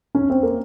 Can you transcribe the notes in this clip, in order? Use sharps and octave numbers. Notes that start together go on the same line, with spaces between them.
C#4
C4
A#3